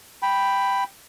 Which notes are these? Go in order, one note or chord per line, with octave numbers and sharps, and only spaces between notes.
G5 B5